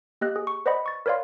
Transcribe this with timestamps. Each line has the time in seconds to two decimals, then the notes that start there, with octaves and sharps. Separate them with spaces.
0.21 A#3 G4 D#5 F#6
0.36 G#4
0.47 C#6
0.66 B4 C5 D5 D#5 F#5 B5
0.86 C#6 A6
1.06 A#4 B4 C#5 D5 F5 C6